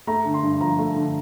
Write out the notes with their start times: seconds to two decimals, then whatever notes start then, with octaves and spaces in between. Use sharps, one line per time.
0.07 A3 A#5
0.25 D3
0.34 C6
0.43 G2
0.61 F3 A#5
0.79 A3
0.96 D3